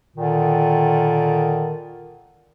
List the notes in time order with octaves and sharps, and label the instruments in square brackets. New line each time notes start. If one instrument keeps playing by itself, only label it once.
[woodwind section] A#2 D3 D#3